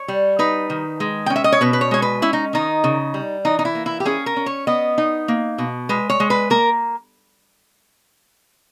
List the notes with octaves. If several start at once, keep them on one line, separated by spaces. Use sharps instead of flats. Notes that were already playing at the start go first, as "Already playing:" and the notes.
Already playing: C#5
G3
D#4 B4
D#3
G#3
G5
C#4
E5
D#5
C#5
B2 B4
B4
C#5
G#3 C#5
B4
C#4 E4
D#4
D#3 D#4
C#3
G3
E3 D#4
D#4
E4
A#3
E4
G4
C#4 G#4
A#4
C#4
C#5
B3 D#5
D#4
A#3
B2
G#3 B4
C#5
G#3
B4
A#3 A#4